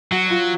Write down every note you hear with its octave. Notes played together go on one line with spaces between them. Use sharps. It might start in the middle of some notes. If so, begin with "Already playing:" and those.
F#3 F#4
F4